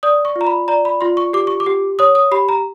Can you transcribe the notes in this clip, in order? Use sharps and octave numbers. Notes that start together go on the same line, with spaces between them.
D5 D#6
C#6
F4
A#5
B5
D5 A#5
B5
F4 C6
C#6
G4 D6
C#6
D6
G4
C#5 D#6
D#6
G4 B5
A#5